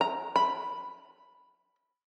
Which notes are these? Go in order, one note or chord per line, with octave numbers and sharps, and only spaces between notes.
A#5
B5